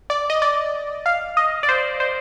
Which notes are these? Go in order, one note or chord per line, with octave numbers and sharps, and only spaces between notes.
D5
D#5
D5
F5
D#5
D5
C5
C5